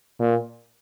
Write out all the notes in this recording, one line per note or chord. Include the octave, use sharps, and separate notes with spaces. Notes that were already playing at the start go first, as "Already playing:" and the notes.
A#2